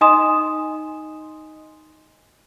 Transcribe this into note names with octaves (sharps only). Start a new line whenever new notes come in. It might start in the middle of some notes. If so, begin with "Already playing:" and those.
D#4 D#5 G#5 C6 D#6 E7